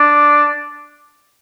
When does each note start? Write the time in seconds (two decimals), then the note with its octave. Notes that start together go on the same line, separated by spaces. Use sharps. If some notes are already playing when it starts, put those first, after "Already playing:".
Already playing: D4